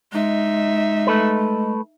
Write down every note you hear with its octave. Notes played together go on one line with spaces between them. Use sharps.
G#3 D#4 E5
A3 A4 B4